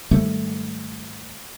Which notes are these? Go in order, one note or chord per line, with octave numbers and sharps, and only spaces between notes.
G#2 D#3 G3 A3